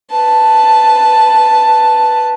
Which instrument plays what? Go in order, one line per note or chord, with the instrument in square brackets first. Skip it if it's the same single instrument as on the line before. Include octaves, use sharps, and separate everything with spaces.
[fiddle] B4 A5